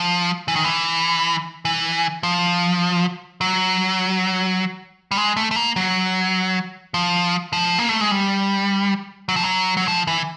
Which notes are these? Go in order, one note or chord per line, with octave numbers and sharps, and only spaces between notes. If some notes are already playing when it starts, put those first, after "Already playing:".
Already playing: F3
E3
D#3
E3
E3
F3
F#3
G3
G#3
A3
A3
A#3
F#3
F3
F3
A#3
A3
G#3
G3
F#3
F3
F#3
F#3
F3
E3